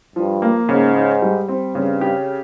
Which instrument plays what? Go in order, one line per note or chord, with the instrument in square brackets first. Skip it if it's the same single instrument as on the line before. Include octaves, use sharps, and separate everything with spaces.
[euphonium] G2 [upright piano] F3
[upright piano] A#3
[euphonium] G#2 [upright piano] C#3
[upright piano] D#4
G3
C4
[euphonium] G2 [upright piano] C#3
[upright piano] G4